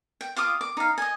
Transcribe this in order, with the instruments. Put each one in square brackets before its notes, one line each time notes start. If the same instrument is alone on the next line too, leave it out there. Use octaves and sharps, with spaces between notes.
[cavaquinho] G5
F4 F5 D6 D#6
D6
D#4 F5
D#5 G#5